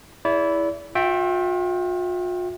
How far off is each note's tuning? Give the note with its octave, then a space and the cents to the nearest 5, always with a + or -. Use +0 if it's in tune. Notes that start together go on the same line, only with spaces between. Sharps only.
E4 +0 G#4 +0 D5 -35
F4 +45 E5 +0 G5 +0